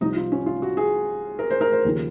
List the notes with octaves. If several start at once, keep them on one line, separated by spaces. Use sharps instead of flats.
C2 C3 F3 D#4
F4
C#4
F4
F#4
G#4
A#4
C5
A#4
C5
D#2 C#3 F3